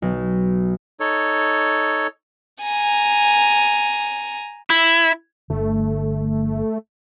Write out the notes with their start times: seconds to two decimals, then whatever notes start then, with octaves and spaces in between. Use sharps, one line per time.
0.02 B1
1.00 D#4 A4 C#5
2.62 G#5 A#5
4.70 E4
5.50 G1 D3 A3